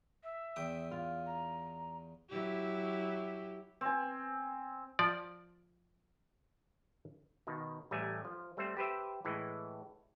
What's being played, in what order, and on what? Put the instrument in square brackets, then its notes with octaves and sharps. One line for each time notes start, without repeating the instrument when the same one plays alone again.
[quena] E5
[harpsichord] E2 G5 D#6
[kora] F4
[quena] A#5
[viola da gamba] F#3 E4 G4
[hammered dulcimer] C4 G#5
[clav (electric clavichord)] F3 D5
B2 D#3
A1 G3 A3 A#4 G#5
F3
G3 A3 C4 C5
G4 B4 C5 E5
A2 E3 G#3